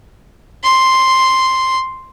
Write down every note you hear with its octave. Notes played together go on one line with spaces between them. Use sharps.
C6